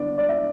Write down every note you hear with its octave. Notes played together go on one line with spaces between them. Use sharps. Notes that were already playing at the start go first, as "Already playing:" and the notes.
Already playing: D3 B3 D5
D5
E5